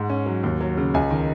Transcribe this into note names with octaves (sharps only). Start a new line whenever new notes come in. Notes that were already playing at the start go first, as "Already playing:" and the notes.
Already playing: G#2 F#5
C#4
F#3
D#2
F#3
C#3
C#2 G#5
D#3